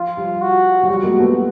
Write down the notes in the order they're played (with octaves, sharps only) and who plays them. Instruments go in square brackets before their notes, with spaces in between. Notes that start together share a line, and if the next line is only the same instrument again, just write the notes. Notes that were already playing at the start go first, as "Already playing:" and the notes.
Already playing: [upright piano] F3 [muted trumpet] F4
[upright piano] F3 G3
[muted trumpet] F#4
[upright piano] F#3
[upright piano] F3 G3 [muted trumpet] F#4
[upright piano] G#3 A#3
A3 B3